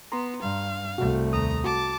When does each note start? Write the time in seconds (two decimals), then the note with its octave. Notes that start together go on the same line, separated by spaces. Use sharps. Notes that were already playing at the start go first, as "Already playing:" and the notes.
0.12 B3 A#5 C6
0.42 G2 F5
0.98 C2 A3 F#4
1.33 D#2 A#5 D#6
1.64 F#4 A5 D6